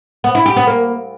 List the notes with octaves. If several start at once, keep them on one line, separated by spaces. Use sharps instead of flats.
B3
E4
G4
B3
A#3